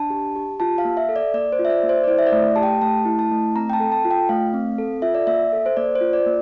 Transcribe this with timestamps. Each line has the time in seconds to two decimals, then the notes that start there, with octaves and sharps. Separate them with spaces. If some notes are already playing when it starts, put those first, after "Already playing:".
Already playing: D4 A5
0.10 G4
0.36 G4
0.60 F4 A5
0.78 F5
0.85 A#3
0.97 E5
1.09 A4
1.16 D5
1.34 A#3 D5
1.52 C5
1.59 F4
1.65 E5
1.70 D5
1.83 A#3
1.89 C5
2.04 D5
2.07 E4 C5
2.19 E5
2.27 D5
2.32 A3
2.56 G4 A5
2.63 G5
2.81 A3 A5
3.05 E4
3.19 A5
3.31 A3
3.56 C4 A#5
3.70 G5
3.73 A5
3.80 A4
3.92 A5
4.05 F4
4.11 G5
4.29 A3 F5
4.54 C4
4.78 A4
5.02 F4 E5
5.14 D5
5.27 A#3 E5
5.52 A4
5.66 C5
5.77 A#3 D5
5.96 C5
6.01 F4
6.13 D5
6.26 A#3